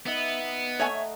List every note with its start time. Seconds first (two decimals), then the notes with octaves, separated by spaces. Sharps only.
0.06 B3 D#4 E5
0.79 A3 C#5 E5 F#5 G#5 A#5